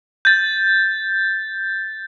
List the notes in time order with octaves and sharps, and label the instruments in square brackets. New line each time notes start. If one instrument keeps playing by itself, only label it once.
[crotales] G6 A6